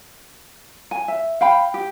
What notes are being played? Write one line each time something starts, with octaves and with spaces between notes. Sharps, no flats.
G#5
E5
F5 G5 B5
G4